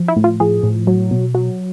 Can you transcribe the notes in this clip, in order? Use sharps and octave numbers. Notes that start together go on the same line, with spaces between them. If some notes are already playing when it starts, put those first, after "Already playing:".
Already playing: F3
E4
A2
F4
F3 G#4
A2
F#3
B2
F#3